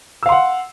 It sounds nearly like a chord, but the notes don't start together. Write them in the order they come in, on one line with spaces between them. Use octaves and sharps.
E6 F5 C6 F#5